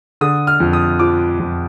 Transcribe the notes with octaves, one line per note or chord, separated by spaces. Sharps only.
D3 D#6
F6
F2
D#6
F3 D6
F2